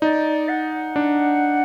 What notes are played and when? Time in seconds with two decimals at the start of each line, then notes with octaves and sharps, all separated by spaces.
0.01 D#4 D5
0.49 F#5
0.96 D4